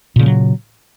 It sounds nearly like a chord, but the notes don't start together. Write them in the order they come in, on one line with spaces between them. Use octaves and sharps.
A#2 C#3 G#3 F#3